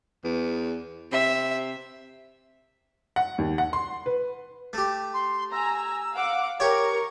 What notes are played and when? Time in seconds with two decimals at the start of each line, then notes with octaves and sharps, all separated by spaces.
0.24 E2
1.12 C3 E5
3.16 F#5
3.38 D#2
3.58 F#5
3.73 C6
4.06 B4
4.73 A3 G4
5.13 C6
5.51 G#5 A#5 E6
6.15 F5 F#5 D6
6.60 G4 A#4 C#5 C#6